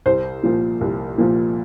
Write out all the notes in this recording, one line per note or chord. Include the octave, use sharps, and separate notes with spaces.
C2 C5
A#2 F3
C2
A#2 F3